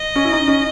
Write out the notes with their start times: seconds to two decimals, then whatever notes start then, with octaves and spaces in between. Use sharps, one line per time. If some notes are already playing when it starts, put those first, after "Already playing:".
Already playing: D#5
0.16 C#4
0.25 E4
0.32 D#4
0.48 C#4